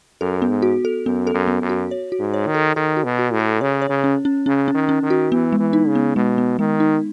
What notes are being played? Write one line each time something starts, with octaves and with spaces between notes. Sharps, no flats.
F#2 A4
B3
G#2
F#4
A4
F#2 B3
A4
F#2
B3
F#2
F#4
C#5
F#4
G#2
C#5
D#3
A4
D#3 A4
F#4
B2
F#4
A2
A4
C#3 C#5
C#5
C#3
C#4
C#4
C#3 C#4
C#4
D#3
C#4
D#3
F#4
E3 B3
G#3
E3
D#4
C#3
B3
B2 G#3
B3
D#3 G#3
D#4